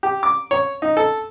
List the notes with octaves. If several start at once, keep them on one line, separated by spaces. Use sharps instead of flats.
G4
D6
C#5
D#4
A4